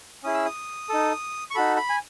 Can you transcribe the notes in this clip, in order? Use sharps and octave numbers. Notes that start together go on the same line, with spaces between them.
C#4 E4 G#4 D#6
E6
D#6
D#4 A4
C#6
D#4 F#4 A4 B5
B5
G#5